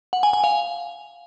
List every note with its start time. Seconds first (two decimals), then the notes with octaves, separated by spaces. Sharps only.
0.13 F#5
0.23 G#5
0.33 G#5
0.44 F5